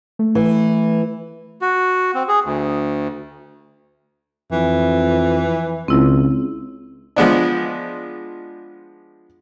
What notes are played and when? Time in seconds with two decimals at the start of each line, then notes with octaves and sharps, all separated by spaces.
0.19 A3
0.35 E3
1.62 F#4
2.14 C4
2.28 G#4
2.45 D2
4.52 F2 E3
5.88 C#2 C4 E4
7.16 F3 G#3 B3 D4